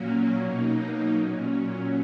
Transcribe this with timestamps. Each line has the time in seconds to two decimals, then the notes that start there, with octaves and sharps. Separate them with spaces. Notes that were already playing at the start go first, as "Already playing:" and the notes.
Already playing: A#2 F#3 A#3 C#4
0.40 B2 F#3 A#3 D#4
1.16 A#2 F#3 C#4